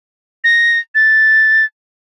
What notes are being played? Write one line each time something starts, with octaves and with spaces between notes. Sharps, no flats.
A#6
A6